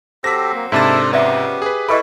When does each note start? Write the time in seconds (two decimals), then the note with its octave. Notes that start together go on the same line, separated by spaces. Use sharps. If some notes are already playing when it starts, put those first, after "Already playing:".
0.24 F#3 C4 G4 A4 A#6 B6
0.55 A#3
0.72 G#2 C3 A#3 D4 E4 A4 C5 A6
1.13 C#3 F3 B3 G4 D5 E5
1.62 G#4 B4
1.89 E3 A4 B4 D#5 B5 C#6